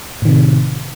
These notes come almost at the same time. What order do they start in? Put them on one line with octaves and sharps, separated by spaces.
A2 D#3 C3